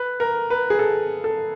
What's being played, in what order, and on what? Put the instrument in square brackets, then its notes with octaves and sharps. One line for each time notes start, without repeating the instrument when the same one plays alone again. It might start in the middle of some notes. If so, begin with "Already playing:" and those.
Already playing: [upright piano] B4
A#4
B4
G#4
A4
A4